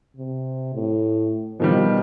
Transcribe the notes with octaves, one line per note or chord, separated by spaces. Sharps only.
C3
A2
B2 D#3 F3 G3